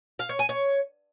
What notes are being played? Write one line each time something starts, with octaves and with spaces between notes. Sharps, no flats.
F5
C#5
G#5
C#5